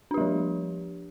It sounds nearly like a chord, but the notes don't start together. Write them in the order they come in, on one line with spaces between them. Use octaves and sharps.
D4 G4 G3 F3